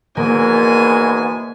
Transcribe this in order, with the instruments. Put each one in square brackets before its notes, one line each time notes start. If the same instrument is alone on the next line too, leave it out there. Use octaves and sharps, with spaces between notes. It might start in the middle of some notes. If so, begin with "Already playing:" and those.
[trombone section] E2 G#2 B2 [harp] A#3 [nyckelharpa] G#5